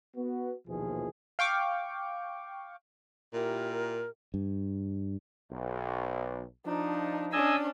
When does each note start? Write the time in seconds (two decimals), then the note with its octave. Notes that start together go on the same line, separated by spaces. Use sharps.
0.16 B3 F#4
0.68 A#1 D#2 B2 E3 F3 G#4
1.39 F5 G5 C#6 D6
3.33 A#2 E4 G4 A#4
4.34 G2
5.51 B1
6.66 F3 D4 D#4
7.33 C#4 D4 D#5 G#5 E6